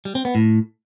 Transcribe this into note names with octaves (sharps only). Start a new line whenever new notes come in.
G3
C4
B3
A2